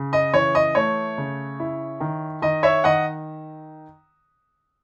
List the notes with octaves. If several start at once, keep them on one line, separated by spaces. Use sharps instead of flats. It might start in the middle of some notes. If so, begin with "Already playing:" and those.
Already playing: C#3
D#5
E3 C#5
D#5
A3 C#5
C#3
E4
D#3
D#3 D#5
C#5 E5
D#3 D#5 F#5